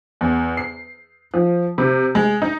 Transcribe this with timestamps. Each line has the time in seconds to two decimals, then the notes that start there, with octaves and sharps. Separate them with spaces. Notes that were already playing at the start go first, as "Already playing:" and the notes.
0.21 E2
0.57 C7
1.34 F3
1.78 C3
2.15 G#3
2.42 D#4